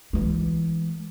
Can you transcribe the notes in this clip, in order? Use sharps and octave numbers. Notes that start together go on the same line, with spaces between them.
E3 G#3